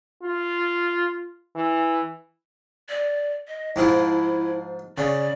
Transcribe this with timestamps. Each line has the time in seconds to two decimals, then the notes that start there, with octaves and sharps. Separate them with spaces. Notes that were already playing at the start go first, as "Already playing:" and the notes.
0.23 F4
1.56 E3
2.89 D5
3.48 D#5
3.76 G#2 F3 E4
4.98 C#3 D5